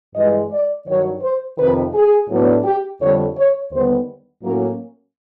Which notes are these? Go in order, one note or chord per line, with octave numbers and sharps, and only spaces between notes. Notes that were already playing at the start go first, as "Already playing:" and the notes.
G2 E3 G#3 D#5
D5
G2 D#3 F#3 C#5
C5
F2 C3 D#3 B4
G#4
A2 F#3 B3 D4
G4
F2 D3 G3 C#5
C#5
D#2 D3 G3 B3 C5
A2 F#3 A#3 C#4 A#4